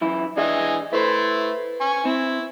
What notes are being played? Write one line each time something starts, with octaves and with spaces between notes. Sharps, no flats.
F#2 E3 E4
E3 D4 G#4 D#5 E5 G#5
A3 E4 B4 C5
G#5 C#6
C4 E4